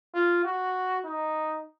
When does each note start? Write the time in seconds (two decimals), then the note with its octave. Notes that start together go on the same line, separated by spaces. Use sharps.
0.14 F4
0.44 F#4
1.05 D#4